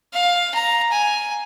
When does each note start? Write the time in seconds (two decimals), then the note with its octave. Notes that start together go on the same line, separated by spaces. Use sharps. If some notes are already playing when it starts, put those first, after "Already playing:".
0.14 F5
0.54 A#5
0.92 G#5